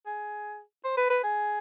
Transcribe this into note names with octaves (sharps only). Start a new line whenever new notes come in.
G#4
C5
B4
B4
G#4